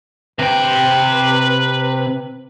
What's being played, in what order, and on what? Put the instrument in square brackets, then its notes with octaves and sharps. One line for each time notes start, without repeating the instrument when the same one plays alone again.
[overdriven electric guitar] C3 G5 [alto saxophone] B4